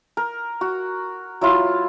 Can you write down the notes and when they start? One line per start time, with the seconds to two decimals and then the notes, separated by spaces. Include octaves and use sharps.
0.17 A#4
0.61 F#4
1.41 F#3 E4 F4